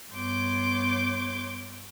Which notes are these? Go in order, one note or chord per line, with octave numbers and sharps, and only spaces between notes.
G2 B3 C#5 C6 D6 G6